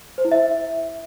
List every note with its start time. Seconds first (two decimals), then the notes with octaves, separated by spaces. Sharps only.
0.18 C5
0.25 E4
0.31 E5